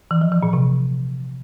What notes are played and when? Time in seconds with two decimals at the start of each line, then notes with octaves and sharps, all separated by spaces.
0.11 E3
0.21 F3
0.32 E3
0.43 A#2
0.53 C3